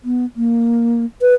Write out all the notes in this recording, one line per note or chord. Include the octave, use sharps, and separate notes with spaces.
B3
A#3
B4